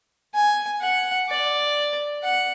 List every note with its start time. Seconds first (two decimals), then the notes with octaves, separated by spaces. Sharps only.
0.34 G#5
0.81 F#5
1.29 D5
2.23 F#5